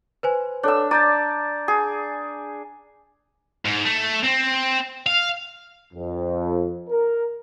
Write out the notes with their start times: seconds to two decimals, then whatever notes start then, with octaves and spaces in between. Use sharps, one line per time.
0.23 B4 C5 G#5
0.63 D4 A4 C#5 E6
0.91 D5 A#5 G6 A6
1.68 G#4
3.65 G#2
3.85 A3
4.24 C4
5.06 F5
5.93 F2
6.90 A#4